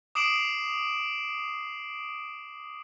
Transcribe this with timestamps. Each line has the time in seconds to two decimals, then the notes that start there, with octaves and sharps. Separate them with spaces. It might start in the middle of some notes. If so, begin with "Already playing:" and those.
0.15 D6 D#6 C7 D7 E7 F#7